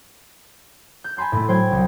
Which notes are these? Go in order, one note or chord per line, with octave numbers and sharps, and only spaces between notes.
G6
G#5 A5 B5 C6 G6
A2 A3
F#3 C5 G5 G#6
C2